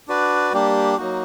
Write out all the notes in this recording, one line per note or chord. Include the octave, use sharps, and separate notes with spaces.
D4 F#4 B4 D5
G3 A#3 D4 G4
F#3 A#3 D#4 F#4